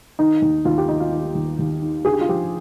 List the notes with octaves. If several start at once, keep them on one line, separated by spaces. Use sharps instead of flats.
D#3 D#4
D#2
D#2 F4
G4
D#3 D#4
F4
D#3
D#2
D#2
D#3
D3 G#4
G4
F4
F3 G4